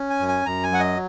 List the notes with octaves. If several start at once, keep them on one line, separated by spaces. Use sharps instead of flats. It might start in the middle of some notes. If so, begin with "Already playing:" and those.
Already playing: C#4
G#5
F#2
G#5
F#2 A#5
G#5
F#3 F#5
D#5